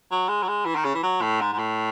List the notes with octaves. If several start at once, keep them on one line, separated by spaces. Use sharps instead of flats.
F#3
G#3
F#3
G#3
E3
D#3
C#3
E3
F#3
A2
G#2
G#2
A2